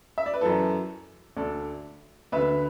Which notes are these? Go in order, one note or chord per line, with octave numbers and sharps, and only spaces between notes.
E5
D5
B4
F#2 E3 E4 A4
D2 D3 A4 D5
D2 D3 B4 E5